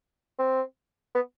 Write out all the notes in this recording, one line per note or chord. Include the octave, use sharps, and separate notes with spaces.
C4
B3